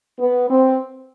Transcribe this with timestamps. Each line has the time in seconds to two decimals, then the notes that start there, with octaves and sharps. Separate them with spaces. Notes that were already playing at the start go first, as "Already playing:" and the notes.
0.19 B3
0.49 C4